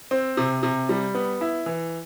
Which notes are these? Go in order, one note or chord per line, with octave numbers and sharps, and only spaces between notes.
C4
C3
C3
G3
B3
E4
E3